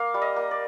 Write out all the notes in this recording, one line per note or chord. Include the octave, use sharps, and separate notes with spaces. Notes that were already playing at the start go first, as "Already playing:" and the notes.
Already playing: A#3 F5
G3
D#5
A#3
D5